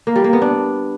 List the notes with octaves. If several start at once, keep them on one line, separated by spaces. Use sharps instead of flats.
A#3
G3
A#3
B3
D4